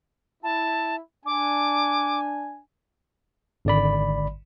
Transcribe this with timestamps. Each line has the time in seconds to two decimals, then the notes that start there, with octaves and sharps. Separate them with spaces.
0.43 E4 A5
1.26 D4 G#5 D6
3.65 G#1 D3 D5 B5